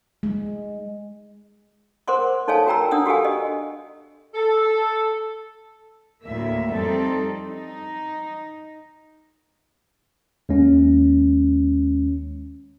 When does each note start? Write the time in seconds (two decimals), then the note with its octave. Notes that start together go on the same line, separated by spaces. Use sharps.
0.23 G#3
2.08 A#4 C5 F#5 C6 D6
2.48 D#4 A4 C#5 F5 G#5 A5
2.66 F#4 A#4 G5 A#5 E6
2.91 D4 F#5 D#6 E6
3.06 F#4 G4 A4 F5 G#5
3.25 D#5
4.34 A4
6.23 D2 A2 A#3 E5
6.72 F2 G3 C4 D#4 A4
7.45 D#4
10.49 D#2 G#3 C#4